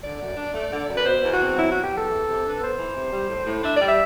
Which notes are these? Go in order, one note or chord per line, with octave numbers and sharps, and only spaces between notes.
D3 D5
F#2
D4
A3
D3
F#2
B4
B2 C5
E2
F#4
C4
F#3 E4
B2 F#4
G4
E2 A4
E3
C3
D4
B4
B3 C5
E3
C3
G3
A2
A2
D4 E5
D5
G3
E5